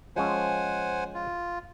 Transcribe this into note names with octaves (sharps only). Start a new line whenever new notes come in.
F3 G#3 C#4 C5 F#5 G#5
F4